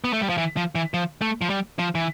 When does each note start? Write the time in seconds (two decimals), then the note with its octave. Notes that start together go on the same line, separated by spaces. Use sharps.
0.04 B3
0.13 A3
0.21 G3
0.29 F3
0.38 E3
0.57 F3
0.75 E3
0.94 F3
1.22 A3
1.42 F3
1.50 G3
1.79 F3
1.95 E3